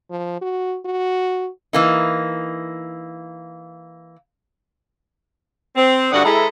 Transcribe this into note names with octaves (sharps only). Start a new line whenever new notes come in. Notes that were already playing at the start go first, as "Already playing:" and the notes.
F3
F#4
F#4
E3 A#3 D#4
C4
G2 D3 F#4 D5 F#5 D#6
G#3 E4 A4 A#5 B5